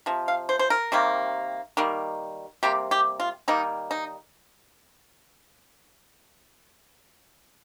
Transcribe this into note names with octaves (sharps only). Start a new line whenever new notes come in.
C3 F3
F5
C5
C5
A#4
C3 D#3 G3 A#3
D#3 G3 A#3
C3 G3 A#3 G4
G4
F4
D#3 G3 A#3 D#4
D#4